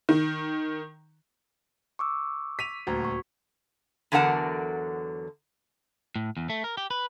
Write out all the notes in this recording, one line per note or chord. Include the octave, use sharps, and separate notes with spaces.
D#3
C#6 D6 E6
B6 D#7 F7
D#1 D2 F#4 A#5 G#6
C#6
E2 D3 F#3 A#4 F#5 A5
A2
E2
A3
A#4
G4
B4